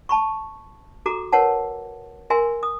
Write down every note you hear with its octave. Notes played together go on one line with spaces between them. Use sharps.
A5 B5 C#6
F#4 A4 A#5 D6
A#4 B4 C#5 F#5 A5
A#4 E5 G#5 C6
D#6